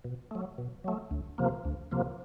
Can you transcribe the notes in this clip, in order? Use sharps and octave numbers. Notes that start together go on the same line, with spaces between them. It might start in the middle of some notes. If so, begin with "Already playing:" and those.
B2
F#3 A3
B2
F#3 A3
D2
C3 F3 A#3
D2
C3 F3 A#3